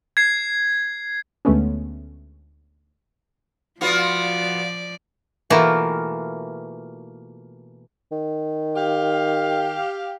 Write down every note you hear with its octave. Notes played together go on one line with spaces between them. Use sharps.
G#6 C7
D2 G#3 A3 B3 C#4
F3 B3 F4 F#4 D5
B2 E3 A3 A#3 F4
D#3
G4 F5